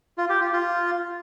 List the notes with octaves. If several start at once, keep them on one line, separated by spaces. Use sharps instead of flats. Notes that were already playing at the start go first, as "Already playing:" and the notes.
F4
G4
F4
F4